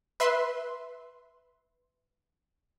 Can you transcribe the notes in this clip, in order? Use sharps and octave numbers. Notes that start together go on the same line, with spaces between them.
B4 E5 C6